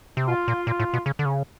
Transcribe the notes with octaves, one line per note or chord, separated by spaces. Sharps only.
C3
B2 F4
A#2
A#2 F4
A2
B2
C#3
D3
C#3